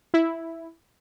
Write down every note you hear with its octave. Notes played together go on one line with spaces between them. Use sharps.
E4